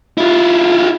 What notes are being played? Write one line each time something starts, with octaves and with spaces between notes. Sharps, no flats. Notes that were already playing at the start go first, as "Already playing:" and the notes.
E4 F4